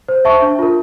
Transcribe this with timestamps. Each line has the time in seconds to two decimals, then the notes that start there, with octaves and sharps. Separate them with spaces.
0.08 C5
0.25 E5 A5 C#6
0.42 D4
0.59 F4 A#4